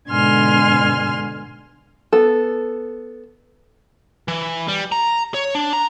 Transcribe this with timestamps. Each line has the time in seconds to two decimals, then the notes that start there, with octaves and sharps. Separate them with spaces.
0.10 G#2 B2 D3 G#5 C6 F6
2.13 B3 A4
4.28 E3
4.68 G3
4.92 A#5
5.34 C#5
5.55 D4
5.73 A#5